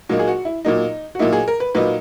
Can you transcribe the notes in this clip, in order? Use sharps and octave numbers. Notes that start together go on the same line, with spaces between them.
A#2 F#3 A#3 D#4
G#4
F#4
E4
A#2 F#3 A#3 D#4
F#4
A#2 F#3 A#3 D#4 E4
G#4
A#4
B4
A#2 F#3 A#3 D#4 B4